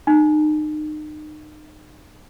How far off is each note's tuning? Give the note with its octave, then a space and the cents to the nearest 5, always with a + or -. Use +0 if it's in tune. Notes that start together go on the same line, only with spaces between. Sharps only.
D#4 -30